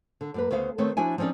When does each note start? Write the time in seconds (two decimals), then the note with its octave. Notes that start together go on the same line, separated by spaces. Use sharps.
0.21 D3
0.34 F#2 A#3 B4
0.51 D2 C#3 B3 C5 F5
0.78 D#3 A3 B3 C4 C#5
0.97 F3 D4 E4 F#4 E5 G#5
1.18 F3 C4 C#4 D#4 D5